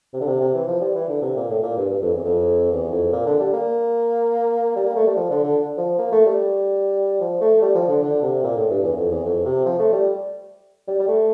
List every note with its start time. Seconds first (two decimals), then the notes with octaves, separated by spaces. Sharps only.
0.13 C3
0.20 D3
0.26 C3
0.40 C3
0.54 E3
0.67 F3
0.81 G3
0.95 E3
1.09 D3
1.22 C3
1.36 A#2
1.50 A2
1.63 A#2
1.77 G2
1.90 G2
2.02 F2
2.14 E2
2.25 F2
2.72 E2
2.92 F2
3.13 A#2
3.26 D3
3.40 G3
3.53 A#3
4.76 G3
4.86 A#3
4.96 A3
5.07 G3
5.16 F3
5.30 D3
5.44 D3
5.77 F3
5.98 A#3
6.12 A3
6.26 G3
7.21 F3
7.41 A3
7.62 G3
7.75 F3
7.89 D3
8.02 D3
8.22 C3
8.43 A#2
8.56 A2
8.70 G2
8.83 E2
8.97 F2
9.11 E2
9.25 F2
9.45 C3
9.65 F3
9.79 A3
9.93 G3
10.88 G3
11.00 G3
11.08 A3